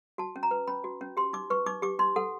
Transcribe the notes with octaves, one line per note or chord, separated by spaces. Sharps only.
F#4 A5
C#4
A#5
B4
C#4 B5
F#4
C#4
G4 C6
D#4 D6
B4 C#6
D#4 D6
G4 D6
D#4 C6
A4 F#5